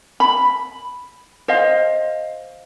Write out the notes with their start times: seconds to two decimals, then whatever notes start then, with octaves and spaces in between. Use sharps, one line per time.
0.20 B5
1.48 C5 D#5 F5